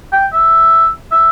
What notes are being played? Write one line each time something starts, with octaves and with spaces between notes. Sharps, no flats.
G5
E5
E5